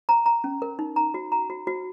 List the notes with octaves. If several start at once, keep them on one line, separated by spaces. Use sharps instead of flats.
A#5
A#5
C#4
A#4
D#4
A#5
F#4
A#5
F#4
F#4